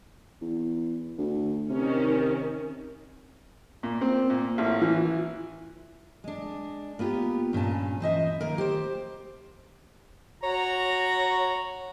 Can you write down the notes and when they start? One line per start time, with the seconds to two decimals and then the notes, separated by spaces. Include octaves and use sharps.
0.41 E2
1.18 D2
1.70 C3 D#3 C#4
3.83 A#2
4.01 C4
4.30 A#2
4.58 A1
4.81 E3
6.24 G#3 D4
6.99 A#3 B3 F4 G4
7.53 G2 A#2 C#4 A5
8.00 E3 C5 D#5 E5
8.41 D#3 A#3 A#4
8.58 G4 C5
10.43 F#4 C#5 A#5